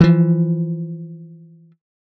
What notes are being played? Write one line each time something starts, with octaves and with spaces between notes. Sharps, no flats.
E3 F3